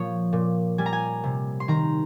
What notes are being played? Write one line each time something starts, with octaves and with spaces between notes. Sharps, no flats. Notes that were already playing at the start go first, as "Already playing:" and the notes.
Already playing: A#2 F3 C#5
A#2
G3 G#5
A#5
G#5
C3
C6
D#3 A#5